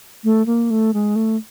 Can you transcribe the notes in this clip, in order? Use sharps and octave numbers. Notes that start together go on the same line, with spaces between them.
A3
A#3
A3
G#3
A3